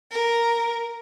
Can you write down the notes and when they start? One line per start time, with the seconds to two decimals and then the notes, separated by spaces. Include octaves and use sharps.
0.11 A#4